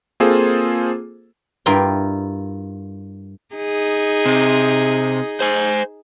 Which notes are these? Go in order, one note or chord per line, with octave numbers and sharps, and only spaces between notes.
A#3 C4 F4 G#4 A4 C5
G2 E4 F4 A#4 G5
D#4 G#4
C3
C5 G#5